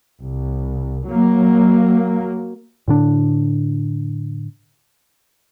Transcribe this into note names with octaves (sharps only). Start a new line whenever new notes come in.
C2
F#3 A#3
A2 D3 D4